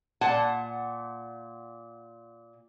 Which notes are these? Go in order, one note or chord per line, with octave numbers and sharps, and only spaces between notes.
A#2 F#5 A5